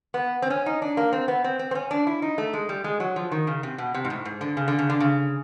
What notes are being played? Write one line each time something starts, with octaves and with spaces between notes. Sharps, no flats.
B3
C4
C#4
D#4
D4
A#3
C4
B3
C4
C4
C4
C#4
D4
E4
D#4
A3
G#3
G3
G#3
F#3
F3
D#3
C#3
C3
B2
C3
G#2
A2
G#2
D3
C#3
D3
C#3
D3
C#3